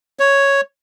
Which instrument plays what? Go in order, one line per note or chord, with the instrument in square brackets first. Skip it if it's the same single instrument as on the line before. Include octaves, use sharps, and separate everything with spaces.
[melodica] C#5